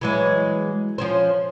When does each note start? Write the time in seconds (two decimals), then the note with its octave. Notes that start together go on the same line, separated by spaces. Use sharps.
0.01 E3 F#3 G#3
0.98 F3 C#4 C5